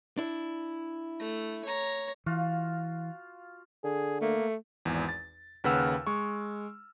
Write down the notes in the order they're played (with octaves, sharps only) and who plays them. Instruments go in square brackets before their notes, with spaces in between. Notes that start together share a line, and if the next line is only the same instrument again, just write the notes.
[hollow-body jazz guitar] D4 E4
[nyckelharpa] A3
C#5 A#5
[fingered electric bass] E3 [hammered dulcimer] F4 F#4 F5
[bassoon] D3 [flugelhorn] G#4
[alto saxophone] A3 [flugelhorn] A#3
[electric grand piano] G#1 E2
A6
D#2 C#3 B4 F#5 E6 F6
G#3 C#6